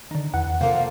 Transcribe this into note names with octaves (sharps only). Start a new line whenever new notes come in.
D3 D#3
E2 F#5
C3 F3 A#3 A4 F5